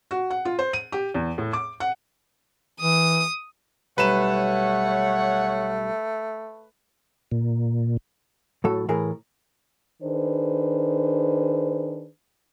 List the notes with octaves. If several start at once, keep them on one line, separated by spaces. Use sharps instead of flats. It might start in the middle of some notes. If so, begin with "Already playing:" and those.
F#4
F#5
F4
C5
D#7
G4
E2
A2
D6
F#5
E3 D#6
B1 G3 A3 B4 C#5 F#5 A#5 E7
A#2
A2 F#3 A4
A2 E3 G#4 A#4
D#3 D4 G#4 B4 C5